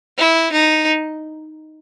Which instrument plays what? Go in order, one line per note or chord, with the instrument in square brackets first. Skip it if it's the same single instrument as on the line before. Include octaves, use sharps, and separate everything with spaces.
[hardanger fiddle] E4
D#4